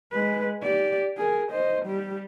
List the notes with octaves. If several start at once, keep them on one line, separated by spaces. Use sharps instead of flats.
G#3 B4
G4 D5
G#4 A#4
C5 D#5
G3 G4